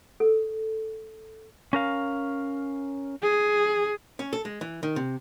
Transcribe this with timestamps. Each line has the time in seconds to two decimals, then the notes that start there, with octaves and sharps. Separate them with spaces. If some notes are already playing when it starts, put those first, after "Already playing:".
0.20 A4
1.73 C#4 A#4 F5
3.23 G#4
4.19 C#4
4.33 A4
4.45 G#3
4.61 E3
4.83 D#3
4.96 C3